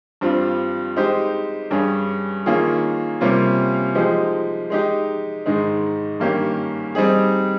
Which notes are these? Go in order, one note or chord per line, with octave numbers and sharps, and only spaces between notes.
G2 G3 C4 F4
G#3 D#4 G4 C5
G2 G3 C#4 G#4
D#3 A#3 C#4 F4 G#4
C3 G3 A#3 C#4 F4
F3 G#3 D#4 G4
G#3 D#4 G4
G#2 D#3 G#3 D#4
G2 D#3 A#3 C#4 G4
G3 C4 D#4 G#4